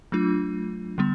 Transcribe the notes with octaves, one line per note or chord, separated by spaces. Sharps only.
F#3 A3 D4 F4
D3 G3 B3